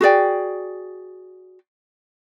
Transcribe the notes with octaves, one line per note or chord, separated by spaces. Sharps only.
F#4 G#4 D5 G5